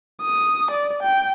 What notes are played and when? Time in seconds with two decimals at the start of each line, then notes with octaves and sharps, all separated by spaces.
0.22 D#6
0.71 D5
1.03 G5